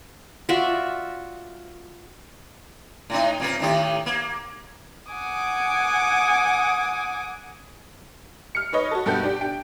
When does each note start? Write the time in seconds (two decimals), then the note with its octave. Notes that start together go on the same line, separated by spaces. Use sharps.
0.49 F4 F#4 D5 E5
3.10 A2 D#4
3.40 A#2 C4 A#4
3.60 A2 D#3 G4
4.06 A#3
5.11 F#5 G#5 D6 D#6
8.55 F6 C#7
8.73 D#4 B4 C#5 D#5
8.91 F#4 A4
9.06 G2 B2 G4 A4 F#5 G6
9.23 D4 G4
9.41 G5